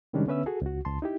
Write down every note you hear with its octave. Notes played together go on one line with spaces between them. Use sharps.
C3 D#3 G3 G#3 C#4 D4
D3 B3 C#4 B4 E5 E6
F#4 G#4 A4
C#2 F#4
C#2 A5 C6
D#4 E4 G4